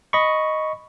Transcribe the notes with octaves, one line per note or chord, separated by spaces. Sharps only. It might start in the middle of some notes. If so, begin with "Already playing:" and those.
D#5 B5 C#6